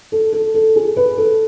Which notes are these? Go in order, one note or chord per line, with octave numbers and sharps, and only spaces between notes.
A4
A4
A4
G#4
B4
A4